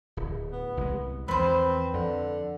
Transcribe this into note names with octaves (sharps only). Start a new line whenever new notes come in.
D1
B3
C2 G#3
E2 F3 C4 B4 C5
F2 D3